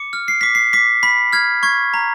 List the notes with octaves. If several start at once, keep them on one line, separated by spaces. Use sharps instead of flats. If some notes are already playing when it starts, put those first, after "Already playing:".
Already playing: D6 C#7
F6
C7
D6 B6
C7
D6 B6
B5 B6
F6 G#6
C#6 G#6
A#5